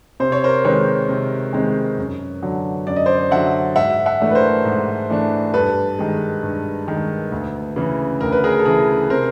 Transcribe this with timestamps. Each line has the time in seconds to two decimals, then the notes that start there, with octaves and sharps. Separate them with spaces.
0.20 C3 C5
0.32 C#5
0.44 A#4 C5
0.65 D#3 G#3 C4 B4 C#5
1.09 C3
1.53 D#3 G#3 C4
1.97 F#2
2.43 D3 F#3
2.87 F#2 D5
2.96 D#5
3.06 C5 D5
3.31 D3 F#3 E5 F#5
3.76 G#2 E5 F#5
4.06 E5 F#5
4.21 E3 A3 D4
4.31 B4
4.35 A#4 C5
4.65 G#2
5.10 E3 A3 D4
5.54 G2 A4 B4
5.99 D#3 G#3
6.43 G2
6.88 D#3 G#3
7.32 D2
7.76 C#3 E3
8.21 D2 A#4
8.32 B4
8.44 G#4 A#4
8.60 A4
8.65 C#3 E3 G#4 A#4
9.10 C3 A#4 C5